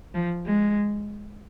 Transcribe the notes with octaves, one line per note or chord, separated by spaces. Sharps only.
F3
G#3